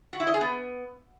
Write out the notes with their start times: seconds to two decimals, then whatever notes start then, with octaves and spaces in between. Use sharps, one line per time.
0.13 F#4
0.20 E4
0.27 D#5
0.34 G#4
0.41 B3